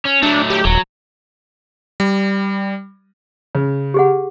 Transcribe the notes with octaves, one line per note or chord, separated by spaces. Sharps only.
C#4
F#3 A3 D4
G4
D#1 F#3
G3
C#3
G4 G#4 F#5